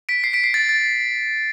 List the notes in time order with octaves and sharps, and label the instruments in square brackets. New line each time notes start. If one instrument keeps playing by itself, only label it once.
[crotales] B6 D7
C7
B6 D7
C7
A6
A6